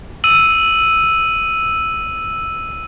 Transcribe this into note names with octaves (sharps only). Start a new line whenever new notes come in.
E6 D#7 F#7